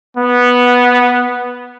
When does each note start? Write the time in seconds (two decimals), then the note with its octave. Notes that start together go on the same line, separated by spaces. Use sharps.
0.17 B3